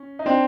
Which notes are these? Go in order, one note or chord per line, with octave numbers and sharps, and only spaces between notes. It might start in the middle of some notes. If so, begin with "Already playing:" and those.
Already playing: C#4
D#4
C4 D4